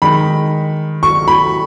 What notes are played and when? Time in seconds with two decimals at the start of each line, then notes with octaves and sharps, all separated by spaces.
0.02 D#3 G#3 D#4 B5
1.03 C#6
1.28 B5